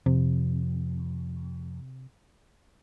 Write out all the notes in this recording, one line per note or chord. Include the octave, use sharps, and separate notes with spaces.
F2 C3